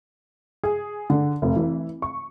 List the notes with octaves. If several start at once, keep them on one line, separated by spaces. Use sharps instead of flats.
G#4
D3
F1
E3
C#6